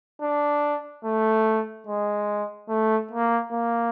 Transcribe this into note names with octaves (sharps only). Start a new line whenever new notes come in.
D4
A3
G#3
A3
A#3
A#3